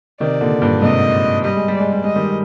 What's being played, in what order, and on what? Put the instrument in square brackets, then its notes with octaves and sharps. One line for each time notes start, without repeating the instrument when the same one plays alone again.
[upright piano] C3 D#3 [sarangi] D5
[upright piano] A#2 D3
G2 A#2
[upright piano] G#2 C3 [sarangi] D#5
[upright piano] G3 [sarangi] D#5
[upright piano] G#3
G3
[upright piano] G#3 [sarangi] D5
[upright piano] G3
[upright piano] G#3 [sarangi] D#5
[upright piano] D#3 G3